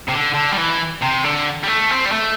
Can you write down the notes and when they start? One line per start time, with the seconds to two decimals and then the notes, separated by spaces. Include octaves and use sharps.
0.09 C3
0.13 D3
0.35 D3
0.52 G3
0.57 E3
1.02 C3
1.24 D3
1.64 G3
1.68 A3
1.91 C4
2.05 G3
2.12 A3